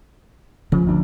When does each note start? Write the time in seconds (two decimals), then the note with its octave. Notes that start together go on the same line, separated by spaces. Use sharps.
0.72 C#3 F3
0.86 G1 D2 D4